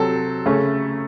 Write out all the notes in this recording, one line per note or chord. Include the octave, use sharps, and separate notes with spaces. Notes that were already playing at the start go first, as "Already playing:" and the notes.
Already playing: C3 F#3 C4 A4
C#3 A3 C#4